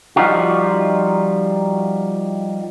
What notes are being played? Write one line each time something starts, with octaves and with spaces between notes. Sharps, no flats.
F3 G3 D#4 F4 F#4